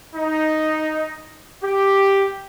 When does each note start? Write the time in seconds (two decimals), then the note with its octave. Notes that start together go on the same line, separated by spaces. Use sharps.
0.15 D#4
1.63 G4